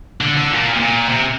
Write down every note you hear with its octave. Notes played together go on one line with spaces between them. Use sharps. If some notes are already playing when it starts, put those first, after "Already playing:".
D3
D3
A#2
C3
A#2
C3